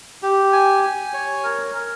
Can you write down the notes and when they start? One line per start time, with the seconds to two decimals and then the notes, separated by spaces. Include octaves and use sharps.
0.22 G4
0.52 G#5
0.83 G#5
1.13 C#5
1.44 A#4
1.74 A#4